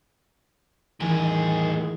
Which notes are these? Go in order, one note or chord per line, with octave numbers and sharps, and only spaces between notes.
A2 D#3 E3 G#4